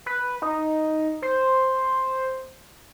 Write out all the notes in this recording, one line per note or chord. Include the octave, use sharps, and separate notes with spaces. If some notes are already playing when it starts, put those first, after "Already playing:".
B4
D#4
C5